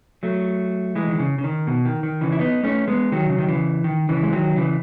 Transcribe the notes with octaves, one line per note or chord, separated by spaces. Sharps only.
F#3 A3
E3 G#3
D#3
C#3
C#3
D#3
B2
D#3
D#3
C#3 E3
E4
B3 D#4
A3 C#4
G#3 B3
D#3 F#3
C#3
D#3
C#3 E3
D#3
C#3 E3
G#3
D#3 F#3
C#3 E3